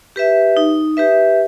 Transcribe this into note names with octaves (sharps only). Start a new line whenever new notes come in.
G4 B4 E5
D#4
G4 B4 E5